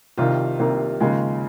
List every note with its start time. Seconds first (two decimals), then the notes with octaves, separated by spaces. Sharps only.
0.17 C2 C3 D#3 F4
0.59 C2 C3 D#3 A#3
1.00 D#2 C#3 F3 G#3